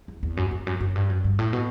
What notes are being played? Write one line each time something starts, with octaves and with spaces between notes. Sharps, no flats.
E2
E2
F#2
E2
F#2
F#2
G2
F#2
G2
A2
B2